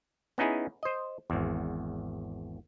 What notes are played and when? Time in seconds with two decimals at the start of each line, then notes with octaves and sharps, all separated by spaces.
0.38 B3 C#4 D#4 E4 G#4
0.83 C5 D#5
1.30 G#1 E2